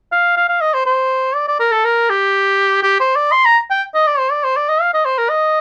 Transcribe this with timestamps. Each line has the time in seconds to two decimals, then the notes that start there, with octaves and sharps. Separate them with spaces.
0.12 F5
0.37 F5
0.49 F5
0.61 D#5
0.74 C5
0.86 C5
1.35 D5
1.48 D5
1.60 A#4
1.72 A4
1.85 A#4
2.09 G4
2.83 G4
3.00 C5
3.16 D5
3.32 C6
3.45 A#5
3.70 G5
3.94 D#5
4.07 D5
4.18 C5
4.31 D5
4.44 C5
4.56 D5
4.69 D#5
4.81 F5
4.94 D#5
5.05 C5
5.18 A#4
5.29 D#5